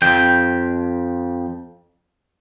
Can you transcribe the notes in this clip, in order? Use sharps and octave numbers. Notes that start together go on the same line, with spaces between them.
F2 G5